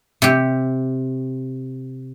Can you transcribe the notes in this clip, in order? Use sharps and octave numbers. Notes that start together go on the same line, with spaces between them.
C3 G4